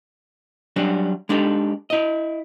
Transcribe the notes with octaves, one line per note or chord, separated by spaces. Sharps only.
F#3 G3 C#4 D4 F#4
G#3 D4 D#4 G4 A4
E4 D#5